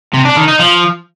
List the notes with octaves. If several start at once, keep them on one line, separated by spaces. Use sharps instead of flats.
C3
D4
D#3
D#4
F3